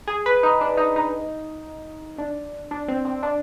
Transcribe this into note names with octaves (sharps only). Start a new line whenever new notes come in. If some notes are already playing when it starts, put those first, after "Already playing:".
G#4
B4
D#4
D4
D#4
D#4
D4
D4
C4
C4
D4